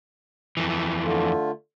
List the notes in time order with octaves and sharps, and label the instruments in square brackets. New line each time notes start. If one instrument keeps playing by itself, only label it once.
[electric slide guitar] F2 E3
[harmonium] D3 A3 F4